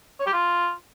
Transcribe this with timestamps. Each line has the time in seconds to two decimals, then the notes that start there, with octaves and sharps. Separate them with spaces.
0.20 C#5
0.26 G4
0.33 F4